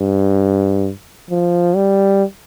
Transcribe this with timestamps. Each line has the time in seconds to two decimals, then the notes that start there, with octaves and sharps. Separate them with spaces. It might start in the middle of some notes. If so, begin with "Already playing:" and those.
Already playing: G2
1.30 F3
1.76 G3